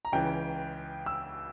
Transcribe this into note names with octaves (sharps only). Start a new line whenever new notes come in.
A#5
C#2 C#3 E3 G5
E6